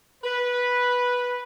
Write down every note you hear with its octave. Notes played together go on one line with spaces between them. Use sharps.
B4